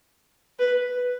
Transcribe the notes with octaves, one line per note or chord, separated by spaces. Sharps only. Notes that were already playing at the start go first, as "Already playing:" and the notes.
B4